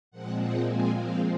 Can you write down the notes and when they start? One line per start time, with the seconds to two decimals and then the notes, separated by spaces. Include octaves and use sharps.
0.11 A#2 F3 G#3 C4 F#5
0.39 F#5
0.68 G#5
0.96 F5